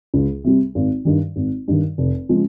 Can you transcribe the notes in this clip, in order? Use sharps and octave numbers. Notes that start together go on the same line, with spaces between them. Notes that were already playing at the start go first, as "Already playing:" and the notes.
C#2
C3 G3
G#1
G2 D#3
G#1
G2 D#3
F1
C#3 F3 G#3